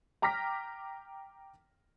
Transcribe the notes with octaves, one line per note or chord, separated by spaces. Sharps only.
G5 A#5 D6 F6 A#6 B6